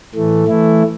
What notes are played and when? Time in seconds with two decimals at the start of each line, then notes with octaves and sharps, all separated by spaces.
0.14 A2 E3 A3
0.48 E3 A3 E4